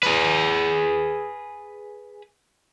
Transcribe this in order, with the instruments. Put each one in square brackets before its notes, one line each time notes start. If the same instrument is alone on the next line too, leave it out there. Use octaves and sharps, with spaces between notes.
[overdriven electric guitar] G#4 B4